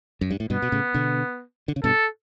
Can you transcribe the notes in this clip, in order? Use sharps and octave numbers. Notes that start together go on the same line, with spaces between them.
F#2
G2
A2
G2 B2 B3
B2
A2 C#3
B2 D3
D3
C#3
G2 B2 A4